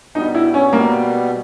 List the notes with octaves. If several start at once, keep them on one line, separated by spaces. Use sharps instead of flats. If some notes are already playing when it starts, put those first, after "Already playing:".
B2 G3 B3 D#4
E4
C#4
B2 G3 A#3 B3